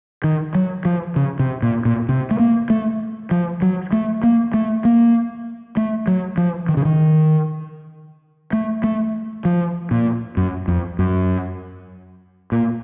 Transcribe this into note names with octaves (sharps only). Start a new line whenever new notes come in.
D#3
F#3
F3
C#3
C3
A#2
A#2
C3
A3
A#3
A3
F3
F#3
A3
A#3
A3
A#3
A3
F#3
F3
D#3
C#3
D#3
A3
A3
F3
A#2
F#2
F2
F#2
A#2